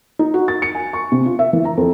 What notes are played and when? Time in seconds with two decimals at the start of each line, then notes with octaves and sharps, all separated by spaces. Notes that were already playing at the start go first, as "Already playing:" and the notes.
0.19 D#4
0.34 F#4
0.48 A6
0.62 C#7
0.75 G#5
0.93 C#6
1.12 C3
1.25 F4
1.39 E5
1.53 E3
1.65 A#5
1.77 F2